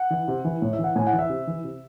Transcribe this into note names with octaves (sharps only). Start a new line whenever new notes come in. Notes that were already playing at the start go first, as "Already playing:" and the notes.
Already playing: F#5
E3
C3
E3
A2
E5
E3
F#5
A2 G#5
F#5
E3
E5
C3
E3
C3